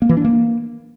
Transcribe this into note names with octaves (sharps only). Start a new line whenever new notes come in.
A#3
E3
D4
A#3